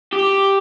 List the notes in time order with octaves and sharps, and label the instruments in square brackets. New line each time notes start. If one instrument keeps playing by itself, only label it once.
[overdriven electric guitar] G4